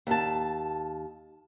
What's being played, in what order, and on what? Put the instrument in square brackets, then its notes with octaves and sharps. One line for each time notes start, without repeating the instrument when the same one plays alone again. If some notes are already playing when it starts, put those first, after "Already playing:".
[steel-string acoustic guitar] D#2 A5